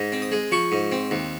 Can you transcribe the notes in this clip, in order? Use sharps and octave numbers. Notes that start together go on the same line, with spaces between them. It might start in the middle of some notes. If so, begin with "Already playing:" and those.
Already playing: G#2
C4
D#6
G#3
F3 C#6
G#2
C4
D#2